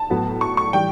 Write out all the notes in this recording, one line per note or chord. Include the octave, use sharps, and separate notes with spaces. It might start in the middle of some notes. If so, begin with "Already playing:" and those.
Already playing: A5
A2 F#3 B3
C#6
C#6
E3 G3 G5